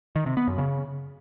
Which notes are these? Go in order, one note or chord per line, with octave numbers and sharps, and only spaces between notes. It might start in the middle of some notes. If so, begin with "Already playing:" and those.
D#3
C3
B3
F#2
C#3